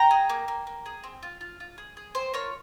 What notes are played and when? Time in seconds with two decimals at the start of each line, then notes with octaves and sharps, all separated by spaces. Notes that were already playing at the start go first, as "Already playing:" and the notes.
Already playing: G5 A#5
0.11 G#4
0.30 A#3
0.48 A#3
0.67 A#3
0.86 G#4
1.04 C4
1.23 F4
1.41 F4
1.60 F4
1.78 G#4
1.97 G#4
2.15 C4 C5
2.34 F4 A#4 C#5